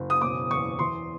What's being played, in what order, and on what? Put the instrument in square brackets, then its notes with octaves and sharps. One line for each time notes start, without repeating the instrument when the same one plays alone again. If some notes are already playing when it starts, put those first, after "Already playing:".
Already playing: [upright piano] F#1
D#6
E1 D6
E2 C#6
E3 C6